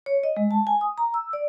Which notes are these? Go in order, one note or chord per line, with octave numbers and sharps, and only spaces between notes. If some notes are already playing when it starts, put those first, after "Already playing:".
C#5
D#5
G#3
A5
G#5
D#6
A#5
E6
D5